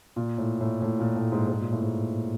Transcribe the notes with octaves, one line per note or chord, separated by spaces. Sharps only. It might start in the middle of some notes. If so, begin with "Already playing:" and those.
A#2
A2
A2
A2
A#2
A2
G#2
G#2
A#2
A2
G#2